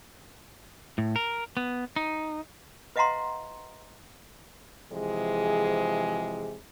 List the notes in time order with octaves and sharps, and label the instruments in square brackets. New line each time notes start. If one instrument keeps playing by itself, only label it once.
[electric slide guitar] A2
A#4
B3
D#4
[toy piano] B4 D#5 F5 F#5 A#5 C6
[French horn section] C3 E3 F3 G#3 G#4